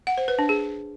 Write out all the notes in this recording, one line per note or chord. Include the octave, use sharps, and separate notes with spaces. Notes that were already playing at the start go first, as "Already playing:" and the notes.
F#5
C5
B4
D4
G#4